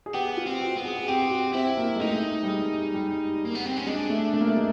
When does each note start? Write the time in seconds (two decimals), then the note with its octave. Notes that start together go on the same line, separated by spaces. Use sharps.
0.06 G#4
0.14 B3 G4
0.37 F4
0.46 C4
0.61 F#4
0.77 B3
0.85 G#4
0.97 G#4
1.08 C4 G4
1.21 G4
1.30 F#4
1.54 C4 E4
1.78 A#3
1.96 G#3
2.01 A3 D#4
2.43 G3
2.47 G#3
2.94 G3
3.45 A#3
3.55 B3
3.66 C4
3.77 C#4
3.87 G#3 D4
4.10 A3
4.34 A3
4.41 A#3
4.49 A3
4.56 G#3